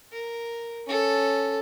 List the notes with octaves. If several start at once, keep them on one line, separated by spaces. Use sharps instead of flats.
A#4
C#4 A4